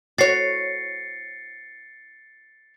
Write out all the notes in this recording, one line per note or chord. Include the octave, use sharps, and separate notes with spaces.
F#4 C#5 A6 C7 C#7